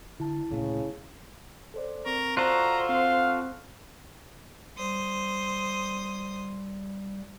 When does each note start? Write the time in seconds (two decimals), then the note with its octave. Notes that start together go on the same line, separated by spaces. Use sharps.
0.20 D3 E4 A5
0.50 D2 A#2 C#3 A3
1.74 A4 C5 D5
2.06 C4 A#4 C#6
2.37 F4 F#4 A4 C5 D5 A#5
2.89 C4 F5
4.77 G3 C5 D#6